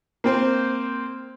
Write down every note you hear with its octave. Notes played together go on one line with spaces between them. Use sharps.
A#3 C4 C5